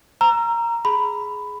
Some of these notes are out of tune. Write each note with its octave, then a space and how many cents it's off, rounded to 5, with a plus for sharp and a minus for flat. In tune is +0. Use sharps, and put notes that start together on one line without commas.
A#5 +0 E6 +40
G#4 +10 B5 +10